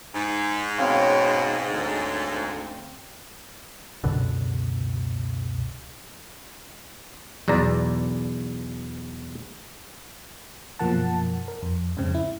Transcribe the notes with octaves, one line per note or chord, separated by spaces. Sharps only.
G#2 D#4
B2 C4 C#4 F5
D2
C#2 F#2 B2 D3
B1 E2 D5 A#5
F#2 B2 F3 A#3 F#5 A5
A#4
F2
F2 G#2 C#3 C4
E4